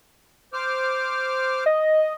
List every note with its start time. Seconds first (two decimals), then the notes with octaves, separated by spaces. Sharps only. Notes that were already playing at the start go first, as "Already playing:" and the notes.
0.53 C5 D6 F6
1.66 D#5